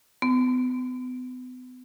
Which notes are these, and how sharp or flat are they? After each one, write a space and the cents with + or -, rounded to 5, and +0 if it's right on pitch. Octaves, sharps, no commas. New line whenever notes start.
B3 +35